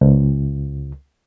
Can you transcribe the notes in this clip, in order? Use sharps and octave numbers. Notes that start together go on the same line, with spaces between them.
C#2